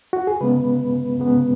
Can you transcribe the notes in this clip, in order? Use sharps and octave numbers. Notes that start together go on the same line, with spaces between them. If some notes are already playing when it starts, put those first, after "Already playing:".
F#4
G#4
C#3 G#3 B3 B4
C#3 G#3 B3